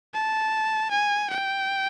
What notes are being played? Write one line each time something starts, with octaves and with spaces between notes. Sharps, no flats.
A5
G#5
G5